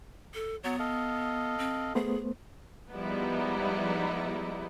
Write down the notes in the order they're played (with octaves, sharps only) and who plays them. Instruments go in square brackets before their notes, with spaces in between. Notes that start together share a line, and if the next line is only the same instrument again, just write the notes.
[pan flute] A4
[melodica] F#3 C#5 [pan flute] B3
[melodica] A4 D#5 F5
[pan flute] C4
[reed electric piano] A3 B3 C5 [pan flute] G#4
[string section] F3 G3 G#3 B3 D#4 E4